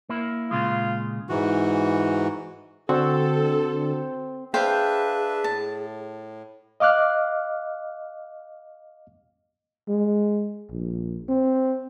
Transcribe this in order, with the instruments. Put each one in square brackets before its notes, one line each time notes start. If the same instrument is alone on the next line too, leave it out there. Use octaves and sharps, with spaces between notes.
[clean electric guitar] A#3 E4
[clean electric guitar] A#2 C#3 G#3 [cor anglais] F4
[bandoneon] G#2 E3 F#4
[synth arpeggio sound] D3 [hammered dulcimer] C4 [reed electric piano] F#4 [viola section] A4
[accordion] D4 B4 E5 [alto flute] G#4 [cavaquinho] C5 F5 G5
[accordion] A2 [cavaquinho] A5
[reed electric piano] D#5 F5 D6 F6 F#6
[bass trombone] G#3
A#1
C4